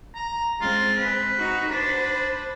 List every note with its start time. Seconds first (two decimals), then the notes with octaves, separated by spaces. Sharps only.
0.15 A#5
0.61 G#3 C4 F4
0.97 B4
1.38 D#4 F#4
1.71 D4 B4 C5